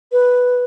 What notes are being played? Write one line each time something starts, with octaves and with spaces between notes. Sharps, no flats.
B4